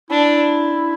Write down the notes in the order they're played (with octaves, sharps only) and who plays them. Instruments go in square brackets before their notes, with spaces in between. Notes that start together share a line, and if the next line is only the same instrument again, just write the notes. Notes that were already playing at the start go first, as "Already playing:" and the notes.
[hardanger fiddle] D4 [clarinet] E4